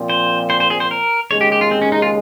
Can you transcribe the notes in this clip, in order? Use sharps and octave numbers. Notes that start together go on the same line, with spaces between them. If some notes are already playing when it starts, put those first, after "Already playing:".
Already playing: A#2 F3 C4
C5
C5
C5
G#4
C5
A#4
D#2 C#3 G#3 C#5
G4
G4
F4
C4
C#4
D#4
F4